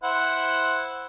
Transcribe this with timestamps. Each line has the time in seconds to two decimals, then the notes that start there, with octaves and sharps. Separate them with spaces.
0.04 E4 C5 F#5